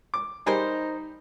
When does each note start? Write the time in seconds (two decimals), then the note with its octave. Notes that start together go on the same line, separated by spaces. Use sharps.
0.14 D6
0.47 G3 D#4 G#4 A#4 C5